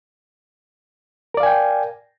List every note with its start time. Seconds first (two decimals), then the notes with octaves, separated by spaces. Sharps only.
1.34 A#4
1.37 D5
1.40 F5
1.43 G#5
1.46 G5